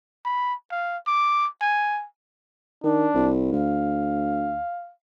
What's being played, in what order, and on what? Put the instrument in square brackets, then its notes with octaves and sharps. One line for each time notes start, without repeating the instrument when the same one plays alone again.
[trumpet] B5
F5
D6
G#5
[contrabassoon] D#3 [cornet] D4
[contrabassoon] C2
[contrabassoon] D2 [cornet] F5